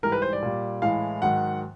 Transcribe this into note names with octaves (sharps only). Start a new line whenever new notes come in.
G#2 E3 G3 A#4
B4
C5
D5
A#2 G3
A2 E3 G#3 F5
G#2 D#3 F#3 F#5